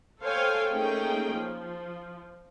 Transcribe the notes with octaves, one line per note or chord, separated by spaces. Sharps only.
A4 C5 C#5 F5 G5 G#5
A3 A#3 C#4 D#4 G#4 G5
F3